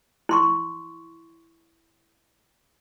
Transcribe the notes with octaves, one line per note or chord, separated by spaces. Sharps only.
E4 C6 C#6